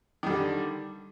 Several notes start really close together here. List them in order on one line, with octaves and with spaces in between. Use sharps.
D#3 G3 D3